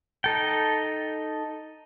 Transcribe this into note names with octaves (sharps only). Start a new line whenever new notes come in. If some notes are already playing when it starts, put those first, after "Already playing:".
D#4 A4 G5